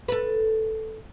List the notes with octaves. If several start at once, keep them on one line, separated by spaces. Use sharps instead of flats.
A4 B4